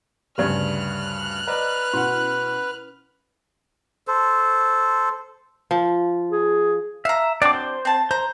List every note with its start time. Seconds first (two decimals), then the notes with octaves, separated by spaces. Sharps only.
0.38 D2 G2 C#3 G4 C5 D5 F6 F#6
1.47 B4 C5 D5 D#5 F#5 A#5
1.94 B2 C#4 E4 F#5 C6
4.08 A4 C5
5.71 F3
6.31 G#4
7.05 E5 F5 A#5
7.42 F#3 C4 D4 D5 D6
7.54 C5
7.85 C4 A5
8.11 C5 A#5